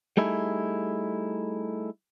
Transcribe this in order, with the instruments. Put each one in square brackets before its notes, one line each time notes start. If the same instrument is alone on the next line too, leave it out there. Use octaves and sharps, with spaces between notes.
[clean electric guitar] G3 A3 D#4 E4 G#4